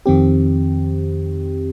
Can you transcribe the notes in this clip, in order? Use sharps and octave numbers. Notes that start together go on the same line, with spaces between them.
F2 D#3 C4 G4